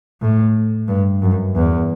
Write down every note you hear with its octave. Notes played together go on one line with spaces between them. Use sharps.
A2
G2
F#2
E2